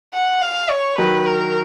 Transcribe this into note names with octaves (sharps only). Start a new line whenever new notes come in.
F#5
F5
C#5
D#3 F#3 B4
A#4